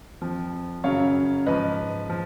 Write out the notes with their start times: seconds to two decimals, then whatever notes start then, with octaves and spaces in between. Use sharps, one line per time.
0.21 F2 F3
0.84 F#2 C#3 F#3 C#5 F5
1.46 G#2 F3 B4 D#5
2.10 F3